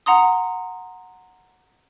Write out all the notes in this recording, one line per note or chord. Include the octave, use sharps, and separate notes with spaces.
F#5 A#5 C6 D#6